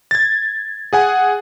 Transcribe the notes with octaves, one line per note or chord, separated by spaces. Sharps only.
G#6 A6
G#4 F#5 G#5